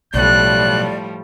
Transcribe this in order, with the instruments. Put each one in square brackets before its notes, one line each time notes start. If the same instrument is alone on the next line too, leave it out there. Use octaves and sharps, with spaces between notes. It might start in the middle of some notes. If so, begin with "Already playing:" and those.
[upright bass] B1 [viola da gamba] A2 F3 G3 [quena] D5 [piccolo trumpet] F#6